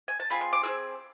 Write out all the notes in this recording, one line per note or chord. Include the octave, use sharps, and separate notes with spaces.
G#5
A5
C4 F4 G#4 B5
C6
D6
C4 F4 G#4 E6